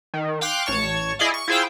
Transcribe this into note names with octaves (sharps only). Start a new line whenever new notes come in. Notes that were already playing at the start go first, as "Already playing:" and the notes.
D#3
F5 G5 C6 D6 F#6
A1 C#5 A5 C#6
E4 G#4 D5 D#5 F5
C#6
E4 F4 G#4 C5 F5 G5